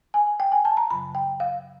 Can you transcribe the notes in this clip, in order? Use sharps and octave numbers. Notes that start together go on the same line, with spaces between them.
G#5
G5
G#5
A5
A#5
F#2 C#3 F#3 B5
G5
F5